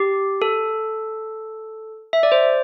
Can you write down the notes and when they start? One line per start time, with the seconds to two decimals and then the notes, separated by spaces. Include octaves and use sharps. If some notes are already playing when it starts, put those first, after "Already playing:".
Already playing: G4
0.42 A4
2.13 E5
2.23 D5
2.32 C5